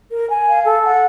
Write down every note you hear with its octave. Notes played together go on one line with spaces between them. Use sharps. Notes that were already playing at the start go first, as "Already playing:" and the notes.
A#4
G#5
F5
A4
F#5